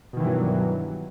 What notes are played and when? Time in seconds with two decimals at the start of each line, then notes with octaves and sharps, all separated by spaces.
0.13 B2
0.17 D#3
0.20 E3
0.23 G2
0.27 F#3